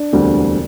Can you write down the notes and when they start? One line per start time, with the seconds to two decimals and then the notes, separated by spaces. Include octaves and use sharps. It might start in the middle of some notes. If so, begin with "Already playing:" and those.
Already playing: D4
0.13 E1 D2 D3 G3 C4